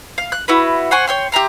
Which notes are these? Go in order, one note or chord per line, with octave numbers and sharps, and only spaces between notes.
F5
F#6
E4 F#4 B4
C5 F#5 G#5 C#6
C#5 G5 C6
G4 E5 A#5 C6